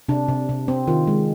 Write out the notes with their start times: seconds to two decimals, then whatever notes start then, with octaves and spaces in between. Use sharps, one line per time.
0.09 C3 D4
0.28 C3
0.49 C3
0.68 C4
0.87 D#3 F4
1.07 G#3